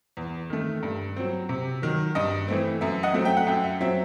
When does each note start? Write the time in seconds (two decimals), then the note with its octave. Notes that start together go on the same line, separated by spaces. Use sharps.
0.17 E2
0.50 D#3 A3
0.83 G2
1.16 F#3 C4
1.49 C3
1.82 D#3 F#3
2.15 G2 D#5
2.48 E3 A3 C4
2.81 F#2 E5
3.03 D#5 F#5
3.14 F#3 A3 C4
3.25 E5 G5
3.37 F#5
3.47 F#2 E5 G5
3.63 E5
3.81 F#3 C4 E5